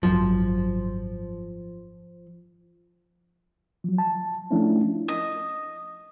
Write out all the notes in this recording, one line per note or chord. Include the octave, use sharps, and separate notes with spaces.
G#1 F#2 F3 F#3
F3 F#3
A5
F3 A3 C#4 D4 E4 F4
D#5